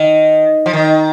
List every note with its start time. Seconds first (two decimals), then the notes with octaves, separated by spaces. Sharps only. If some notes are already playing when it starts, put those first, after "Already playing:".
Already playing: D#3
0.66 F3
0.73 D#3